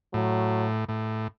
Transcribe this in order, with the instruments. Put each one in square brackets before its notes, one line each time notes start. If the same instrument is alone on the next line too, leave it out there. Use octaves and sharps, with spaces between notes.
[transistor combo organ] A2 [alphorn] F#3
[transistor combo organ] A2